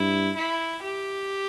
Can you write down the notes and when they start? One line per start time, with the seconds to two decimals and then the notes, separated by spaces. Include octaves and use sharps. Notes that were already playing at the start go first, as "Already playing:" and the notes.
Already playing: G2 E4
0.36 E4
0.83 G4